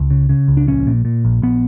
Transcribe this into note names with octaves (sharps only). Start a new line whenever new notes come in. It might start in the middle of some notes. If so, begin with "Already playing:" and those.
Already playing: C#2
C#3
C#3
C#2
D4
A#1 C#4
A#2
A#2
A#1
A#1 B3